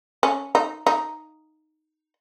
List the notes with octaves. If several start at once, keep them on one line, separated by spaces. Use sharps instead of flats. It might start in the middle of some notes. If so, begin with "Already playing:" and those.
C#4
D#4
D#4